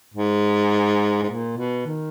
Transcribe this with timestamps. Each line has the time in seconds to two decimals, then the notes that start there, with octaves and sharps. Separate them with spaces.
0.14 G#2
1.23 G#2
1.29 A#2
1.57 B2
1.86 D#3